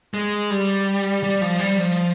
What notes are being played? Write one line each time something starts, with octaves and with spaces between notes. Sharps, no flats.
G#3
G3
G3
F3
G3
F3